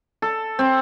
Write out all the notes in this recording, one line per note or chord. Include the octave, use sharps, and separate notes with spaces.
A4
C4